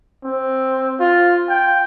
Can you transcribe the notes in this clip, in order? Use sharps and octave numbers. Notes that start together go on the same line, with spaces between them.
C4
F4
G5